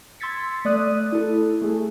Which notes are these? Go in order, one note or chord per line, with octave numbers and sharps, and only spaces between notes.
C6 E6 G#6 A6 B6 C#7
A3 D5 D#6 F#6 D#7
E4 A4
A3 G#4